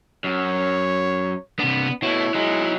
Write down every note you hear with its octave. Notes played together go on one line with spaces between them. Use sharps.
F#2 C#5
C3 B3 D4
B2 A3 E4 C#5
F#3 G#3 D#4